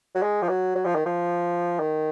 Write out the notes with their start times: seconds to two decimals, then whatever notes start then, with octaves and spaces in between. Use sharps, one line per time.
0.15 F#3
0.23 G#3
0.42 F3
0.49 F#3
0.75 F#3
0.86 F3
0.95 D#3
1.06 F3
1.80 D#3